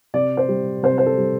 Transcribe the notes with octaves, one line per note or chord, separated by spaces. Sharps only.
C3 D5
C5
G3
C3 C5
C5
A4
G3